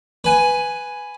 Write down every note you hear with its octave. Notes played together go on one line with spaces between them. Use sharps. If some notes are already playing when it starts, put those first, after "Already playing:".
B4 G#5